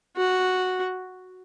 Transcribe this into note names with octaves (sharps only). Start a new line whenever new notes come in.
F#4